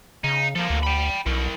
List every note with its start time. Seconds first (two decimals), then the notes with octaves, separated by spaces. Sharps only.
0.24 C#3 D#4
0.56 F3 A#3 A4
0.70 D2
0.83 G5 B5
1.26 B1 E4 A#4